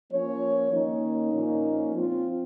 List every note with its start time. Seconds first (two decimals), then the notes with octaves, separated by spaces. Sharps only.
0.11 F3 A#3 C#4 C#5
0.72 D#3 A#3 C#4 D#4
1.33 A#2 F3 A#3 C#4
1.94 F3 C4 F4